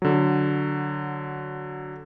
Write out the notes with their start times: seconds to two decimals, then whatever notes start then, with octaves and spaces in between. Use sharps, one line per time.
0.02 D3 F#3